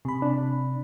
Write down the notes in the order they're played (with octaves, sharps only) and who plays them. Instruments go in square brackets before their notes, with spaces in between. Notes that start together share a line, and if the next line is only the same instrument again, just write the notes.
[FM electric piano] C3 B5
[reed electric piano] D4